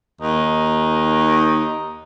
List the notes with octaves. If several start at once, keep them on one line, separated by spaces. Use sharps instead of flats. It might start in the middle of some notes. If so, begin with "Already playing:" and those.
D#2 D#4